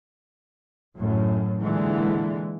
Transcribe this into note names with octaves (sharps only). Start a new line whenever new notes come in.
F#2 A2
A#2 D3 E3 G#3